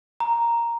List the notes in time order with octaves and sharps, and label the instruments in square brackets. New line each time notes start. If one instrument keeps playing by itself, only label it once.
[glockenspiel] A#5